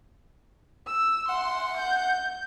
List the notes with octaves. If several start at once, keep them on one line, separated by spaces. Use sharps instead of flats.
E6
F#5 C6
G6